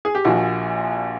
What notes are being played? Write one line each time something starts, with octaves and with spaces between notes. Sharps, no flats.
G#4
G4
A#1 A#2 F3 F#4